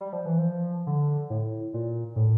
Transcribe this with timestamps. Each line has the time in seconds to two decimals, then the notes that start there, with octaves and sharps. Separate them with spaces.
0.01 G3
0.13 F3
0.26 E3
0.38 F3
0.87 D3
1.30 A2
1.74 A#2
2.16 A2